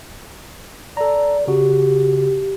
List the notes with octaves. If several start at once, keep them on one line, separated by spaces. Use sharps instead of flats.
A4 D5 A#5
C#3 F#4 G4